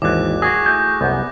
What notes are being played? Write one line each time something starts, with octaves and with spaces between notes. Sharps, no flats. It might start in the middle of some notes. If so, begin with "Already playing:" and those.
G#1 D#2 G#2 E3 D6 F#6
F#4 G#4 A#6
A3 E4 G#5 G6
C2 F#2 B3 E5